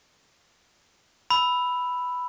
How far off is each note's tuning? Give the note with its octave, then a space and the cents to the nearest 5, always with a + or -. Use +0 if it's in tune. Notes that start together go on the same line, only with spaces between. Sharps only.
B5 +0 E6 +0